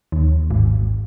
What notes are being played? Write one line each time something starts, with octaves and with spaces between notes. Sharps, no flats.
D#2
G#1